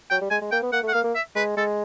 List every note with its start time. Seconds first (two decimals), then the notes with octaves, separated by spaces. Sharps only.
0.10 F#3 G5
0.21 G3
0.30 G#3 G#5
0.41 G#3
0.51 A#3 G5
0.63 B3
0.72 A#3 F#5
0.83 A3
0.88 F#5
0.94 A#3 F5
1.04 A#3
1.15 E5
1.35 G#3 B4
1.57 G#3 A4